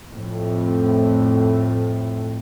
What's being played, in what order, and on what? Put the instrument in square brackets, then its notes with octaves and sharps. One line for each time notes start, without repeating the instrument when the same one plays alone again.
[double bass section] F2 A2